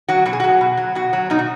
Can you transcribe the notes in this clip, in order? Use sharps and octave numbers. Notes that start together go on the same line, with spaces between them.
F#3 F#4
B2 F#4
G#4
F#3 F#4
B2
F#3
B2 F#4
F#3
B2 D#4
F#4